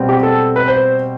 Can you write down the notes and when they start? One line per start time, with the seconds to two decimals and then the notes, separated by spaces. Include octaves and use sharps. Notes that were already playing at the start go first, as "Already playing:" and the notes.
Already playing: B2 G3 C4
0.09 G4
0.23 A4
0.56 B4
0.68 C5